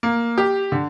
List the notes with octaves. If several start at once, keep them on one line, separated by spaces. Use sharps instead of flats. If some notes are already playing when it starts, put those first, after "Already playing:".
A#3
G4
D3